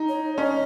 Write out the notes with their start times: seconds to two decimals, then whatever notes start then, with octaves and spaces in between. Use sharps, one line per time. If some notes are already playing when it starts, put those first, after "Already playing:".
Already playing: D#4
0.09 C#5
0.37 C#4 D#5